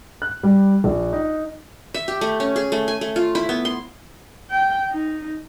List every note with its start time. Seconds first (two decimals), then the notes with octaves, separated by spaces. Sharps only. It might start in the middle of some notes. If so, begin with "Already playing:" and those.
0.22 F#6
0.43 G3
0.84 A#1
1.13 D#4
1.94 E5
2.08 G4
2.21 A3
2.40 C#4
2.56 G#4
2.72 A3
2.88 G#5
3.01 A3
3.16 F4
3.35 E4
3.49 B3
3.65 C6
4.50 G5
4.90 D#4